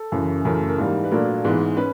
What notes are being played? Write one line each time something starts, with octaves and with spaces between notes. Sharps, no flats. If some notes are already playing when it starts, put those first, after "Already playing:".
Already playing: A4
F#2 C#3 E3
F#2 C#3 E3 A3 A#4
A#4
G#2 E3 G3 A#3
B4
A#2 F#3 A3 D4 A#4
G#2 E3 G#3 B3
C#4 B4